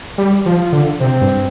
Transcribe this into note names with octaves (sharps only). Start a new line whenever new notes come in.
G3 G4
F3
F4
D3
C3 C4
G2